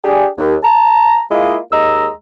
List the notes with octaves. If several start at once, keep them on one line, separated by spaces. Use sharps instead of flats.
D4 G4 G#4
D#2
A5 A#5
G#3 A#3 E4 F4 D#5
D#2 G#3 D#5 A#5 E6